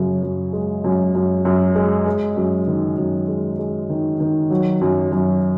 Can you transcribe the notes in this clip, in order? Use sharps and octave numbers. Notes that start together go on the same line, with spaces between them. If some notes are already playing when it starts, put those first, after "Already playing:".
Already playing: F#2 C#3
F#2
G#3
F#2
F#2
F#2
G#3
G#3
F#2
D#3
F#2
G#3
G#3
D#3
D#3
F#3
F#2
F#2